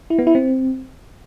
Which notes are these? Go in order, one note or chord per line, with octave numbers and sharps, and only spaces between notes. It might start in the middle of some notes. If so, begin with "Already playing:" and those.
E4
B3
E4
C4